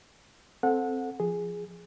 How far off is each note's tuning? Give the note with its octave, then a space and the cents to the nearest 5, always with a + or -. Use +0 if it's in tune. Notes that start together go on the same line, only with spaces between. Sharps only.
C4 +0 A4 +0 F#5 -25
F3 -10 G#4 +0